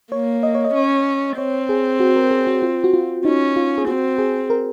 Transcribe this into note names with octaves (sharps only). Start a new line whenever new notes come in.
A#3 C#5
D#5
C#5
D#5
C#4
C4 C#5
G#4
F#4
A#4
G#4
F#4
F4
F#4
F4
C#4 D#4
F4
G#4
C4 F#4
G#4
A#4